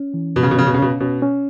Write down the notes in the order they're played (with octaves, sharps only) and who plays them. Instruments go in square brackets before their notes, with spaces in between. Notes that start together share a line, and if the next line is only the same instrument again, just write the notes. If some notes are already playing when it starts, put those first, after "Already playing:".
Already playing: [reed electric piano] C#4
E3
[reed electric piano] G2 [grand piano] B2
[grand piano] C#3
B2
[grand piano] C#3 [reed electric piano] C#4
[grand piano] B2
C#3
[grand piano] B2 [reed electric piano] C#4
[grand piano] B2 [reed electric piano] C#4
[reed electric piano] C#4